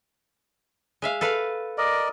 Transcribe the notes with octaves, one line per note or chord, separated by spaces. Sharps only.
G#3 E5 F5
A4 B4 F5
A#4 D5 D#5